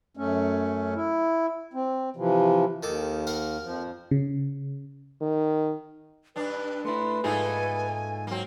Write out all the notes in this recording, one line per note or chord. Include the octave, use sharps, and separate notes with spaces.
F#2 A3 C#4
E4
C4
C3 E3 F3
D#2 D#3 A4 D6
A#4 F5 F#5
F2 F3
C#3
D#3
G2 D4 B4
A3 E4 B4 C6
G#2 A3 A#3 D#4 F4 G#4 G#5
F#3 A#3 C4